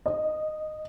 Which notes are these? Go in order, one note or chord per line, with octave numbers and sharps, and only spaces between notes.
D#5